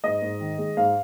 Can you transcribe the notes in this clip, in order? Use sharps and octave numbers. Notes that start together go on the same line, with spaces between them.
G#2 D#5
G#2
D#3
G#3
G#2 F5